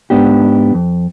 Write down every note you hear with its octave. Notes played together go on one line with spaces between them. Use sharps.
G#2 B3 D4 G4
F2